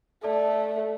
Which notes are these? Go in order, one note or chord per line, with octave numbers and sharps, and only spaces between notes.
A3 A4 D5 A5